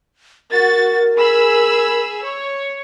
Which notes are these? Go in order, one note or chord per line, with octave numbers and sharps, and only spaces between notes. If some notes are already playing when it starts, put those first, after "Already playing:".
F#4 A#4 A6
G#4 B5 E6
C#5